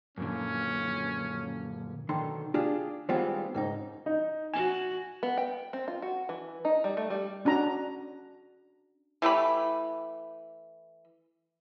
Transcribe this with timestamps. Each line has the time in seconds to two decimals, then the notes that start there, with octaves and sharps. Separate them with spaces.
0.18 F#2 A#2 D3 C#4
2.09 B1 D3 D#3 C6
2.54 D4 F4 G4 G#4
3.09 D#3 G3 G#3 B3 C4 F4
3.54 C#2 G#2 D#4
4.06 D#4
4.54 F#4 G#5 E7
5.23 B3
5.38 G5
5.73 C4
5.88 F4
6.02 F#4
6.29 E3
6.65 D#4
6.84 G3
6.97 A3
7.10 G3
7.45 C#4 D4 F#4 A#5
9.22 E3 A3 G4 B5